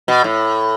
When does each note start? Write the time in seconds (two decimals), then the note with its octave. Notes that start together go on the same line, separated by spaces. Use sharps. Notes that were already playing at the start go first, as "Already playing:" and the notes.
0.08 B2
0.24 A2